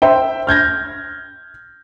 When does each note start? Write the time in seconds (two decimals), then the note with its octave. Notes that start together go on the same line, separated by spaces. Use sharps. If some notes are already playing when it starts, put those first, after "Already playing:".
0.02 C5 E5 G5
0.47 F6 G6 G#6 A#6